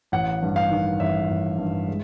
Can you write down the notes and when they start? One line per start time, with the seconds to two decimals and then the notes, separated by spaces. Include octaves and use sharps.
0.12 A1 F#5
0.42 G2
0.56 F5
0.71 D#3
1.00 A1 E5
1.30 A1
1.58 G2
1.88 G#3